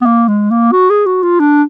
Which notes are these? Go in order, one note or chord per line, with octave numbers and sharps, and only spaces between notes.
B3
A#3
G#3
A#3
F#4
G#4
F#4
F4
D4